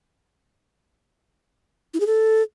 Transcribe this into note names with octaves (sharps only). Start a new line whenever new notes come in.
E4
G#4
A4